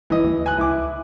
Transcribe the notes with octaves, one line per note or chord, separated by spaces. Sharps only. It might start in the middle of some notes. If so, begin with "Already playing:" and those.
G1 E3 D#5
D#2
G#5 F#6
C#2 E4 D6